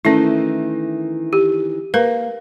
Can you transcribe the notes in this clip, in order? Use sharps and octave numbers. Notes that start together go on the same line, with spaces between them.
D#3 E3 A3 C#4 E4
G4
A#3 A#4 B4 F5